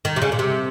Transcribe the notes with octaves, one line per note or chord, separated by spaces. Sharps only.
D#3
C3
C#3
A#2
C3